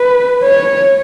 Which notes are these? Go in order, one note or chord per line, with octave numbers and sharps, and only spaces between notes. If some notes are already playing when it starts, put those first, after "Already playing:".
Already playing: B4
C#5